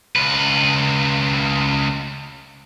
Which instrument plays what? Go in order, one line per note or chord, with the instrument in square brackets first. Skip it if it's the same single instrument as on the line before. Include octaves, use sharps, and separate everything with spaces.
[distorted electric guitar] C#2 B4